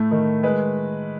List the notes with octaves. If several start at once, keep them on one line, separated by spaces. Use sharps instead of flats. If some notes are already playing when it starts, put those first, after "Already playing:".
Already playing: A2 A3
D#3
G#3 B4